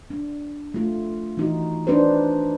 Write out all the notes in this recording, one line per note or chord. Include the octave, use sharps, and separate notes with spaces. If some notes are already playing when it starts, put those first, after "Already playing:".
D4
A3 F4
E3 D#4 F#4
D4 D#4 F#4 B4 C5